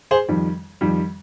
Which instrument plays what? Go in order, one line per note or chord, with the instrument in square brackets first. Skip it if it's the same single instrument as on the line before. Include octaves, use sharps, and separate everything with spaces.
[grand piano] G#4 C5
F2 D#3 G3
F2 D#3 G3